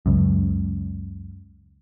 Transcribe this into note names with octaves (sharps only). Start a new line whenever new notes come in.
C#2 F#2